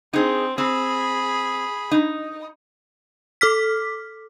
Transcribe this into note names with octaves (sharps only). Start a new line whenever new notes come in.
C4 D#4 G#4
C4 G#4 B5
D#4
A4 D6 F6 B6